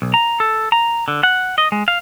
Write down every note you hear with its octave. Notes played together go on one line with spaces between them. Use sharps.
B1
A#5
A4
A#5
D3
F#5
D#5
G#3
F5